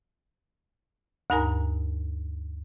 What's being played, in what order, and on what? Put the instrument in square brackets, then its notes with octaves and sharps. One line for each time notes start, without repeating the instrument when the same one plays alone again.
[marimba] D2 G2 D#4 A#4 G#5 A#5